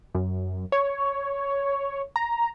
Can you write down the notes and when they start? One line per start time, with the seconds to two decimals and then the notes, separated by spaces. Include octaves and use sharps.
0.15 F#2
0.72 C#5
2.16 A#5